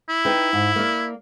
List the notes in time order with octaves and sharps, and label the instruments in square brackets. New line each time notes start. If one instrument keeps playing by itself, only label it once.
[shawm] E4
[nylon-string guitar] D#4 B4 G5
G#2
A#3 D5